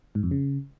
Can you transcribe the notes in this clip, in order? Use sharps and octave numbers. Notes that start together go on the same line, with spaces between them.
G#2
F2
C#3